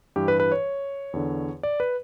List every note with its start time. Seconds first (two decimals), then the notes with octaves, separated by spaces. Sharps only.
0.16 G2 E3 G4
0.28 B4
0.40 B4
0.52 C#5
1.13 E2 D3
1.63 D5
1.80 B4